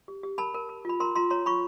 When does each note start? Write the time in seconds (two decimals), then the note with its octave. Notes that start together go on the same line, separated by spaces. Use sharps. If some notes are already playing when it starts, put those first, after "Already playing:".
0.08 G4
0.23 G4
0.38 A#4 A5 B5
0.54 A#4
0.69 A#4
0.85 F4 B5
1.00 A#4 A#5 C6
1.16 F4 A#5 C6
1.30 C#5 A#5 C6
1.46 F4 B5 C#6